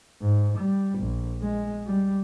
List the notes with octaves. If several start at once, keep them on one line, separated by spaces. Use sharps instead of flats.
G#2
G3
A#1
G#3
G3